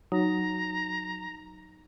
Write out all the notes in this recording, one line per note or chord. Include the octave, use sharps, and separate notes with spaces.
F#3 D#4 A#5